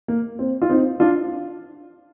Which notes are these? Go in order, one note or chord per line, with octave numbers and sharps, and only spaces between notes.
A#3
C4
F4
C4 D#4
D4 F4